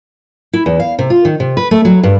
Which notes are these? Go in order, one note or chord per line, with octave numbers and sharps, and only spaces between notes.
E4
E2
F5
C3
F4
D#3
C3
B4
A3
F#3
G2